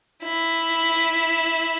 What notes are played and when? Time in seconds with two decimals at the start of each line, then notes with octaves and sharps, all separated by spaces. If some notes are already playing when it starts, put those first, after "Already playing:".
0.24 E4